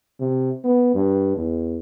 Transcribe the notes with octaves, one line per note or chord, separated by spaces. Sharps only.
C3
B3
G2
E2